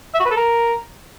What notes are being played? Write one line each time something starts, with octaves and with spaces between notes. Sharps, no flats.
E5
F#4
B4
A4
A#4